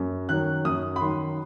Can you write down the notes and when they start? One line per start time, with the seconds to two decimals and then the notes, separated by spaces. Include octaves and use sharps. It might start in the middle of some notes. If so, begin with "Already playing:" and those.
Already playing: F#2
0.29 D#3 F#3 F#6
0.65 F#2 D#6
0.96 B5
1.01 D#3 F#3 C6